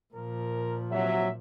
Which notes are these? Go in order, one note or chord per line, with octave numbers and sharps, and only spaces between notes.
A#2 F3 A#4
D#2 C3 F#3 E5